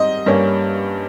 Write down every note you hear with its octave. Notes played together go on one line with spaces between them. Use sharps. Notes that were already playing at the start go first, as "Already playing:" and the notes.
Already playing: G#2 G3 C4 D#5
G2 G3 A#3 C#4